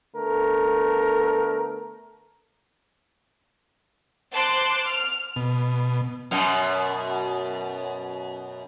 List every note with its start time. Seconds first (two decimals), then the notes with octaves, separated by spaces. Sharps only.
0.15 D3 A3 B3 A#4
4.33 C5 A5 C6 D6 F#6
4.86 F6
5.36 B2
6.31 F#2 B2